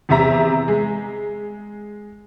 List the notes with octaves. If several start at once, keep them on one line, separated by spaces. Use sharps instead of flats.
E2 C3 C4 E5 A#5
G#3